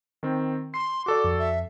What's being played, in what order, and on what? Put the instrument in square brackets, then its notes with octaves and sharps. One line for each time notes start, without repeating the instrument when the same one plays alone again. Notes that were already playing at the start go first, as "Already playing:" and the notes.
[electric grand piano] D#3 C4
[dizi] C6 [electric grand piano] C7
[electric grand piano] F#4 A4 D5 [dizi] D6
[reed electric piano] F2
[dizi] E5